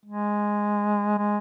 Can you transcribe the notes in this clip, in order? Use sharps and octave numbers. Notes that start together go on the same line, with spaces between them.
G#3
G#3